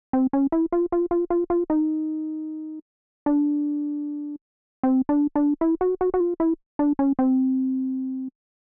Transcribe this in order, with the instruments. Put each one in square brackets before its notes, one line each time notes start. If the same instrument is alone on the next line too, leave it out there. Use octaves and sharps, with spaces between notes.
[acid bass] C4
C#4
E4
F4
F4
F4
F4
F4
D#4
D4
C4
D4
D4
E4
F#4
F#4
F#4
F4
E4
D4
C#4
C4